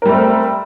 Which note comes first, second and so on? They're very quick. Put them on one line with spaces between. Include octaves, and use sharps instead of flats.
A#4 G3 A3 C4